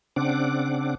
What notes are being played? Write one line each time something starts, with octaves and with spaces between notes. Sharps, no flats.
C#3 C4 D4 F#5 D6